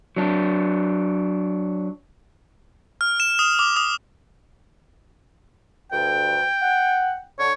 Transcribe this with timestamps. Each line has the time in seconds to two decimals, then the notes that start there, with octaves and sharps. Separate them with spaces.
0.16 F#3 D4
3.01 F6
3.20 E7
3.39 D#6
3.59 D6
3.77 D#6
5.92 D2 G2 G5
6.62 F#5
7.39 D3 C#5